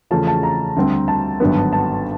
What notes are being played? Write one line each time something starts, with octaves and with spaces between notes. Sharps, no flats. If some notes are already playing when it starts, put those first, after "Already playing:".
E2 C#3 F3 A3 C#4 A5
A5
A#5
D2 D3 G3 C4
A5
G#1 G2 D3 F#3 B3
A5